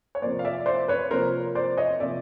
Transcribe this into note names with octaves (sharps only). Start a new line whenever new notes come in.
C#5
C3 F3 A#3 C5 D5
F5
D5 E5
C5 D5
B4 C#5
C3 F3 A#3 A#4 C5
C5 D5
C#5 D#5
C3 F3 A#3 D5 E5